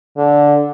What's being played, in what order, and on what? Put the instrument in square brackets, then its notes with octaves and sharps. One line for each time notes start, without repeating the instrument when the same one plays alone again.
[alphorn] D3